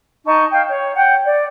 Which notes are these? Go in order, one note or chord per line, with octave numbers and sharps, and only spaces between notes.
D#4 A5 C#6
F5 G5
C#5
F#5 G5
D5